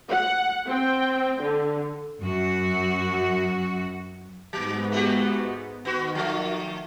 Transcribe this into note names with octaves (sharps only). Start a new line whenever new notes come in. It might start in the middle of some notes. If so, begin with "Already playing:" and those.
F#5
C4 G5
D3
F#2 F#4
G#2 F#3 B3
A3 F#4 G4
D#3 B3 F#4
F3 A3